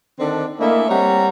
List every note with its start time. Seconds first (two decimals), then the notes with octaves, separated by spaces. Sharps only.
0.18 D3 D#3 C4 D4
0.58 A3 A#3 D4 E4 G#4 D#5
0.89 G3 C4 C#5 F#5 A#5